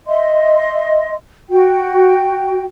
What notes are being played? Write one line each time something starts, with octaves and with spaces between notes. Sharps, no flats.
D#5 E5 C6
F#4 G5